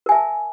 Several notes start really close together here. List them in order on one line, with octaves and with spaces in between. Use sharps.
A#4 G#5 E5 A5